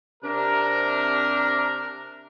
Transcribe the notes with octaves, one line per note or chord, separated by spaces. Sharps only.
C3 D4 A#4